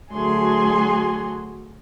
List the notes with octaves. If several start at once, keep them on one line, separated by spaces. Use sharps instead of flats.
D2 F#3 F#4 G#4 G#5 C6